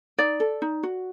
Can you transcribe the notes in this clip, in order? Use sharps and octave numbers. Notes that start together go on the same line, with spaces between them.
D#4 D5
A4
D#4
F#4